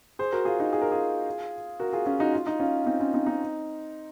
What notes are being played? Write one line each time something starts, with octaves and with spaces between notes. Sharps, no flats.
G#4 C5
F#4 A#4
F4 G#4
D#4 F#4
G#4
A#4
F4 G#4
F#4 A#4
F4 G#4
C#4 F4
D#4 F#4
F4
D#4
C#4 F4
C4 D#4
C#4 F4
C4 D#4
C4 D#4